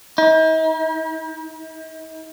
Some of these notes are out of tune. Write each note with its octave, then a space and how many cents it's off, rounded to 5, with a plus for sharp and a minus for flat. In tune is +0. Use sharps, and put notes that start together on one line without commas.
D#4 +45